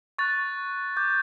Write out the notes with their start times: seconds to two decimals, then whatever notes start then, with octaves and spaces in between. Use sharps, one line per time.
0.18 C#6 F#6 A6
0.97 D6 G6